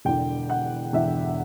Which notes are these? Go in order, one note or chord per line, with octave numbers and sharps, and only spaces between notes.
E1 E2 D3 G5
F#5
E1 E2 D3 E5